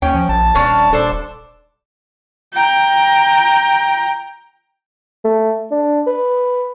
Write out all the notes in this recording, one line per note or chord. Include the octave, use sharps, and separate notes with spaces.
D#2 C#4 G5
F3
A#1 A5
D#1 C#4 D4 F5
D#1 D4 A4 C5
G5 A#5
A3
D4
B4